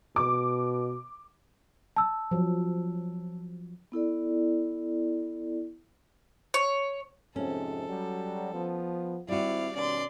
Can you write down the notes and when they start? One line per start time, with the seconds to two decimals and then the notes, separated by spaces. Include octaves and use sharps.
0.16 B2 D6
1.96 A5 E6
2.31 F3 F#3
3.92 B3 E4 A4 D5
6.54 C#5
7.36 F2 G#2 C3 C#4 A4
7.89 F#3 G3
8.53 F3 B3
9.28 G#1 G3 C4 E4 F#4 D5 F5
9.76 B2 D#3 C#4 D5 C6